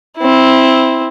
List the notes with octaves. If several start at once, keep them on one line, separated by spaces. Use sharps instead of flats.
C4 E4